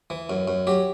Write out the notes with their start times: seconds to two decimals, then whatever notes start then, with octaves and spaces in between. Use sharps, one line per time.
0.10 E3
0.30 F#2
0.48 F#2
0.67 F#3 G4